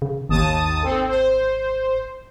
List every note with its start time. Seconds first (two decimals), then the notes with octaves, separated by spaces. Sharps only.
0.02 C#3
0.29 G#1 D#2 A5 D#6
0.83 C4 A4
1.08 C5